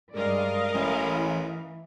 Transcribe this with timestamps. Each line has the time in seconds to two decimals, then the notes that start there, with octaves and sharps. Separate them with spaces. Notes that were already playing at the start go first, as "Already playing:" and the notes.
0.14 G2 G#3 A#4 D5 D#5 F5
0.74 A1 E3